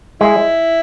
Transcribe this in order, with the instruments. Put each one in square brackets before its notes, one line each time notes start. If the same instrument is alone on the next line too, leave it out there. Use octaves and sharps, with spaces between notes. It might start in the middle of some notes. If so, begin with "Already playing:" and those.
[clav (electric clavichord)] G#3 [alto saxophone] E4